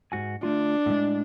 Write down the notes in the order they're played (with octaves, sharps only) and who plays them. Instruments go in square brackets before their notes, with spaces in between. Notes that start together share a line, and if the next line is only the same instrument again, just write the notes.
[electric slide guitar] G#2 F#4 G#5
[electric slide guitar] D3 A3 F4 [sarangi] D4
[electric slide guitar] A2 G#3